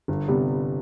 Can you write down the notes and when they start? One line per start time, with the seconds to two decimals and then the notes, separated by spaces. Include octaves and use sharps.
0.08 G1
0.28 C3 G3 B3